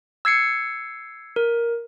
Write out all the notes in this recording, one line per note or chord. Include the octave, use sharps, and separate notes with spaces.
E6 G#6 C7 C#7
A#4